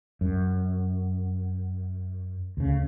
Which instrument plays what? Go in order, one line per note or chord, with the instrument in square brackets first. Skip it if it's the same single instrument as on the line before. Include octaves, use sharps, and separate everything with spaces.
[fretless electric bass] F#2
D2 C#3